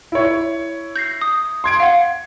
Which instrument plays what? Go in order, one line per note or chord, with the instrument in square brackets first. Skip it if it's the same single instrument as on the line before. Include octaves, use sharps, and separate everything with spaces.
[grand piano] E4 C#5
[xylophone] G6 A#6 C7
D#6
[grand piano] C6 G#6 D7
[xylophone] F5 F#5